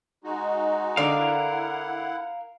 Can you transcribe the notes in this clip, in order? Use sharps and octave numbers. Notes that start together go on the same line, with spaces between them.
G#3 D#4 F#4
D3 A#4 D5 F5
E4 F#5